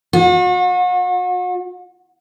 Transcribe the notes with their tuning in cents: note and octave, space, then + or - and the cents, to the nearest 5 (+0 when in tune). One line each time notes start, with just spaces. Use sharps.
F#4 -40